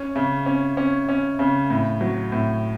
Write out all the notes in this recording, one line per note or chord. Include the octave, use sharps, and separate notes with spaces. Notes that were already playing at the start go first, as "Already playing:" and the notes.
Already playing: C#4
C#3
C#4
C#4
C#4
C#3
A2
F#3
A2